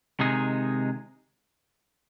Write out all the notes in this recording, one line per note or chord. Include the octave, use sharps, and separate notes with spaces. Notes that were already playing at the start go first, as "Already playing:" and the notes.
C3 D#3 G#3 D#4 G#4